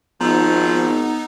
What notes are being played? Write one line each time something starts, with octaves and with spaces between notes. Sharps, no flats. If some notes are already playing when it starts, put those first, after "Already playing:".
G#1 F3 B3 D#4 A#5 E6